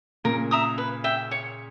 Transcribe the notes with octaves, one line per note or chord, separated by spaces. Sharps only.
A#2 C#3 A#4
E5 A#5 D#6
B4
E5 G5
C#5